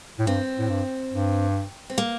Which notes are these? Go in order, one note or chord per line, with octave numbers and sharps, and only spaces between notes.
A2
G2 C4
A2
G2
G2
C4
A#3